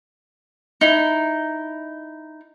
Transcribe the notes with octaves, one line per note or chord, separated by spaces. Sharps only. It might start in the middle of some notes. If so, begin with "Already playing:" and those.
D#4 E4